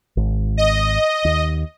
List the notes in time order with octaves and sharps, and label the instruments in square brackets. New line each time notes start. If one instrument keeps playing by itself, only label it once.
[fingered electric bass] G#1
[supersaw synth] D#5
[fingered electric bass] D#2